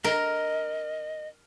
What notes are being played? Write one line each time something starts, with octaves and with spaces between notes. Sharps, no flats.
A#4 D#5